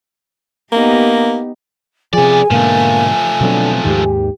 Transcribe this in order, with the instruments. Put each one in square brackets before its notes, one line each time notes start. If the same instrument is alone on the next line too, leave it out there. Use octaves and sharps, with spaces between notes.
[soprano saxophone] A#3 [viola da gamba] B3 D#4 G4
[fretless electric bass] C3 F3 [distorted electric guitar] B3 D5 [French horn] G#4 [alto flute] G#5
[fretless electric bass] G#2 B2 D3 [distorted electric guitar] F3 A3 [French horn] A#3
[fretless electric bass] B2 F#3 C4 [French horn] D3
[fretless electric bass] D#2 G#2 D#3 [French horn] G4